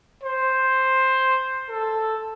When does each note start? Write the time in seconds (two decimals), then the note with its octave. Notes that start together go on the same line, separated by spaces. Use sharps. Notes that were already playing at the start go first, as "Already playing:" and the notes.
0.23 C5
1.69 A4